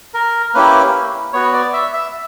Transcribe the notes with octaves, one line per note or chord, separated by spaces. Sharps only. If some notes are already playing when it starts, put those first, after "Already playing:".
A#4
A#3 C#4 E4 G4 B4
B3 F#4 C#5
D5
E5
E5